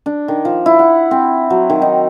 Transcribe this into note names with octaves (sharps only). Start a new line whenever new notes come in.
D4
D#3
F3
E4
F#5
C4
F#3
D#3
D#4